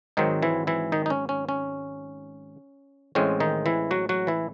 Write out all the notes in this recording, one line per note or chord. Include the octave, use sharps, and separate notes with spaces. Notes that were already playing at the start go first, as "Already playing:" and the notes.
G#1 G#2 D#3 F#3 C4 D#4
E3 E4
E3 E4
D#3 D#4
D#4
C#4
C#4
C#4
A1 A2 G#3 C4 C#4
D#3 D#4
E3 E4
F#3 F#4
F#3 F#4
E3 E4